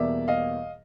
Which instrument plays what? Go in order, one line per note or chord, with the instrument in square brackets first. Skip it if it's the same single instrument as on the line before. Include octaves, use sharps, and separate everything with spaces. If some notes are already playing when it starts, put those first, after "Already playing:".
Already playing: [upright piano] E2 B2 G3 A#3 D5 E5
D#5 F5